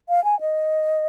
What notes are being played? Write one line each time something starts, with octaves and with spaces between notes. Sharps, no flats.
F5
G#5
D#5